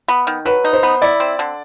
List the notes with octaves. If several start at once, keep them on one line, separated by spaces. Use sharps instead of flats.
B3
D#3
F#3 B4
D#4
C5
B3
E4 D5
C4
D3